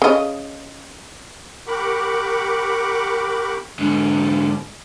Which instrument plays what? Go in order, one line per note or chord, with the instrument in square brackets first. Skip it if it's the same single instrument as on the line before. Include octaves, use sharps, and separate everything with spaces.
[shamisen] C#3 D#5
[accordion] G4 A#4 F#5 B5 C#6 D6
[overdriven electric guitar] G#2 D3